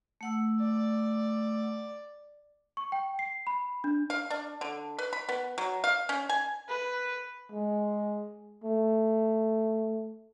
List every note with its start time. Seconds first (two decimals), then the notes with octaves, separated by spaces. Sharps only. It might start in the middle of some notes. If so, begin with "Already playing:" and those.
0.21 A3 F#5 E6
0.61 D5
2.77 C#6
2.92 G5
3.19 C7
3.47 B5
3.84 D4
4.10 F5
4.30 D4
4.61 D3
4.99 B4
5.13 B5
5.29 B3
5.58 F#3
5.84 F5
6.09 C#4
6.29 G#5
6.68 B4
7.52 G#3
8.64 A3